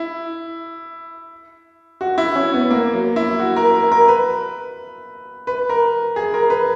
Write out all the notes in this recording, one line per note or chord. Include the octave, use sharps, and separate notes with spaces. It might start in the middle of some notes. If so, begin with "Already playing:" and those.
Already playing: E4
F#4
E4
C#4
B3
A#3
F#3
E4
F#4
A#4
A#4
A#4
B4
B4
A#4
G#4
A#4
B4